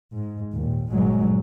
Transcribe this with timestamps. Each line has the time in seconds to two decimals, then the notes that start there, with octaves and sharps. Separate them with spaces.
0.15 G#2
0.53 D#2 A#2
0.92 G1 A#2 F#3 G#3